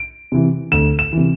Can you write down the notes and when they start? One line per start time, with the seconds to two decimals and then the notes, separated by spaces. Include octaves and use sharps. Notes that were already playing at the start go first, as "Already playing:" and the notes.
Already playing: D7
0.32 C3 E3
0.72 D2 E7
0.99 E7
1.13 C3 E3